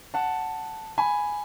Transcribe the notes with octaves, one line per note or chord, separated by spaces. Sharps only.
F#5 A5
G#5 B5